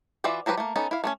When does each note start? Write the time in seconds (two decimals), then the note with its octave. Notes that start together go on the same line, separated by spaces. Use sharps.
0.24 E3 F4 F#4 D5 E5
0.46 F3 F#3 G4 G#4 B4
0.57 A3 A#3
0.76 B3 C#4 D#4 A4
0.91 E4 F5
1.04 A3 A#3 C#4